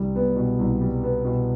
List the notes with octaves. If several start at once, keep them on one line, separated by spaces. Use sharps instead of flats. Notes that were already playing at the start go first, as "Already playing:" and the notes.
Already playing: C2 G3
B3
B2
C2
G3
B3
B2